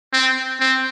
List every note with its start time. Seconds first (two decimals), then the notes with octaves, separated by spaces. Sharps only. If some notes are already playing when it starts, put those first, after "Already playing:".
0.13 C4
0.60 C4